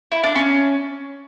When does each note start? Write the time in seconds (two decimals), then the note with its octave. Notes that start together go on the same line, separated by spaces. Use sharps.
0.12 E4
0.24 D4
0.36 C#4